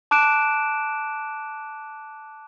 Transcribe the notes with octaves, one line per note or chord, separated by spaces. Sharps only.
A5 D6 F#6 D7 E7